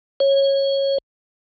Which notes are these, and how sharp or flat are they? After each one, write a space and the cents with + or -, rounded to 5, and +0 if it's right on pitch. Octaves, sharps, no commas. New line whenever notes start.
C#5 -15